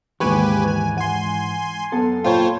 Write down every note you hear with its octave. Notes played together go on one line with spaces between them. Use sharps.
D#2 G#2 E3 G#3 G4 B4 G#5 C#6
G#5
F#5 G#5 C6
F#2 B3 A4
A#2 F4 C5 C#5 G5 B5